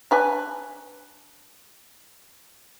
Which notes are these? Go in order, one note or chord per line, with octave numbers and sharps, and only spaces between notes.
D4 B4 G#5